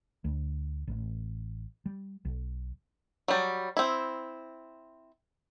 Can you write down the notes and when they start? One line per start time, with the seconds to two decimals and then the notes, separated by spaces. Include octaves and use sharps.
0.24 D2
0.87 A1
1.86 G3
2.25 B1
3.28 F#3 G3
3.77 C4 E4